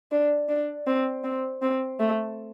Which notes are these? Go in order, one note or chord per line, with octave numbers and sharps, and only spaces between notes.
D4
D4
C4
C4
C4
A3